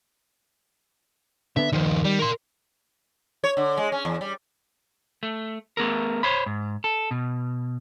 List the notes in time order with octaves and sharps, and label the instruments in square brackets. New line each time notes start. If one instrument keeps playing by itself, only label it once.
[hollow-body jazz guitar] D3 B3 [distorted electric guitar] E5
[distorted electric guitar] D#2 F3 [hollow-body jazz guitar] D#3
[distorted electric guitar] G3
A#4 C6
[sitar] C#5
D3
G#3
C#4
E2
G3
[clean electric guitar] A3
A3 B3 G#4 A#4
C5 C#5 B5
G#2
A4
B2